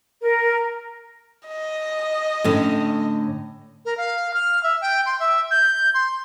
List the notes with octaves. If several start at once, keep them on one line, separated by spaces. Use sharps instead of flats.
A#4
D#5
A2 D3 C#4
A#4
F5
F6
E5
G5
C6
E5
G6
C6